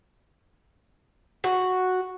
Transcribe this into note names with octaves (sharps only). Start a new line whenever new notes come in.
F#4